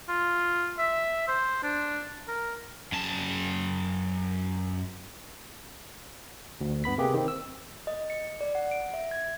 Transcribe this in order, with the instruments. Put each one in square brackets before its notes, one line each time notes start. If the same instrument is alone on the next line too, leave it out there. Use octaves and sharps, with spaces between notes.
[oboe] F4
E5
C5
D4
A#4
[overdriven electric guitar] F#2 A5
[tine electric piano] D2
G2 B3 B5 B6
C3 A#3 G4 G#4 B4
D#3 C4
E6
[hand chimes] D#5
C#7
D5
F#5
D7
E5
G#6